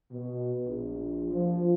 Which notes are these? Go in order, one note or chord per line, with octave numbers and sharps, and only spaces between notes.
B2
A#1
F3